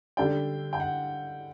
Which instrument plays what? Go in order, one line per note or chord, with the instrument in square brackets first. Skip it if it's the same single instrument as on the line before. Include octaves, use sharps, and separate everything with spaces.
[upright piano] D3 G3 D4 A4 D5 [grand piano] G5
[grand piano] G5
F#5